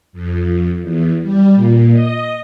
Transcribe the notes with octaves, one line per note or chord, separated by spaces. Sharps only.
F2
E2
G3
A#2
D#5